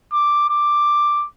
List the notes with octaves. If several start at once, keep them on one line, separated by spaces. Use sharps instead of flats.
D6
D6